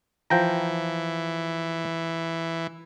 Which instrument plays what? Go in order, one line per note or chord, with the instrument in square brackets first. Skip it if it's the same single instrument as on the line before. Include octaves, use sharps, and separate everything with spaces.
[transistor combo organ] E3 [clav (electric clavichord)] F3 G5 A#5